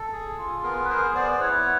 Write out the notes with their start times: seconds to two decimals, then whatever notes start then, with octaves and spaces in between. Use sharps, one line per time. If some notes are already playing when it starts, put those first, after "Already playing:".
Already playing: A4
0.13 G#4
0.38 F4
0.63 B3 G#4 A#4
0.85 B4
0.89 G#4 A#4 C5
1.15 B3 C5 D5
1.33 C5
1.40 E4 B4 C#5